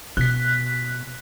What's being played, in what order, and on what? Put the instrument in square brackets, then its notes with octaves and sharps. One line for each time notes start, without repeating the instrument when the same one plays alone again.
[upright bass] B2 [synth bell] F#6 B6